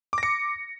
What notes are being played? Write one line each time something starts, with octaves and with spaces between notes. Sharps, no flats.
D6 A#6 C#7